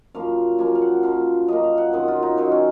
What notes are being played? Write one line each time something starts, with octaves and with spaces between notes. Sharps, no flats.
F#2 F3 A#3 F5
F#2 F3 A#3 G#5
F5
F#5
F#2 F3 A#3 F5
F#2 F3 A#3 D#5
F5
F#5
F#2 D#3 F#3 C4 D#5
F4
D#4
F#2 D#3 F#3 C4
C#4